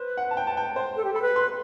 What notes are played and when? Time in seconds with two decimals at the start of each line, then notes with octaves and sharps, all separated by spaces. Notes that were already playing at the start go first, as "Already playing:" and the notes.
Already playing: B4 C5
0.17 F#5
0.31 A5
0.37 G5
0.47 A5
0.57 G5
0.76 C5
0.96 A4
1.04 G4
1.13 A4 B5
1.22 B4
1.36 C6